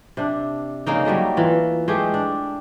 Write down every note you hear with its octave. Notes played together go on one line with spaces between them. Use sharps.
C3 D4
C#3 G#3 A#3 D#4
F#3 G3 A3 A#3
E3 F4
G#3 A3 G4 G#4
D4